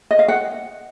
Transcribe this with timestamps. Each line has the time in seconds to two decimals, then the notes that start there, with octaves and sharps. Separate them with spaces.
0.11 D#5
0.19 F5
0.28 F#5